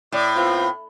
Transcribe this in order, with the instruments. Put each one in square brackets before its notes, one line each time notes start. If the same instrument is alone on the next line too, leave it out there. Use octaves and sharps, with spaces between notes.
[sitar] A2 [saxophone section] D5
[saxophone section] B3 C4 F4